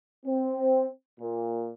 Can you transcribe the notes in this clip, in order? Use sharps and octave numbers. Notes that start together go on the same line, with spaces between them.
C4
A#2